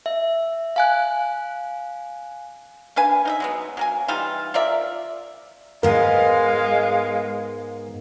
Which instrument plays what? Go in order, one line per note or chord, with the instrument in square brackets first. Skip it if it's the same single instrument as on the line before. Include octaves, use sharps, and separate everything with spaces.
[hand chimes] E5
F5 G#5 F#6
[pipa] A#3 D4 B4 G#5
D#4 D#5 E5
F#3 G#3 B3
F#3 A#3 G#5
E3 G3 D#4 F4
F4 A#4 D5 E5
[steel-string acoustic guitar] G#2 B3 [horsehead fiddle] G#3 [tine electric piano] A#4 [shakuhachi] F5